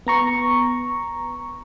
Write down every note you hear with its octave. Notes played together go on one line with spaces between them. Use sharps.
B3 A#5 C#6